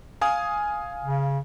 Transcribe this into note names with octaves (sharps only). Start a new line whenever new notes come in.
F5 G#5 D#6
C#3